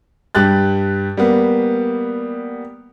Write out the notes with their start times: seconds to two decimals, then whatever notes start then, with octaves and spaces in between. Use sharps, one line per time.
0.35 G2 G4 F#6 A6
1.17 G3 A#3 B3